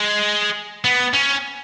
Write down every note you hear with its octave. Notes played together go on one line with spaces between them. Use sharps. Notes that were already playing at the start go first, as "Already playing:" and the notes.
Already playing: G#3
B3
C#4